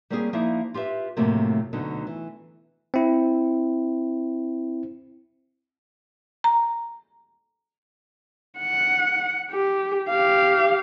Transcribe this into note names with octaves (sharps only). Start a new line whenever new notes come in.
G3 A#3 C4 C#4 F#4 G#4
F3 A#3 D#4 E4 E5
F4 G4 B4 E5
F#2 A2 C3 F3 A3 A#3
D2 B2 D3 F#3 D#4 A4
E3
C4 E4
A#5
F#5
G4
G4 F5